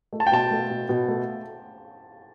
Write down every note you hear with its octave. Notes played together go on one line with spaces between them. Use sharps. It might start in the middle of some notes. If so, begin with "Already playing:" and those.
A3
A5
G5
B2 A5
A3
B2
B2
A3